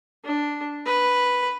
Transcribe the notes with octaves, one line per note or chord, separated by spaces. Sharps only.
D4
B4